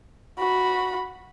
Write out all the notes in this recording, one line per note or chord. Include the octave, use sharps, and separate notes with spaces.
F#4 B5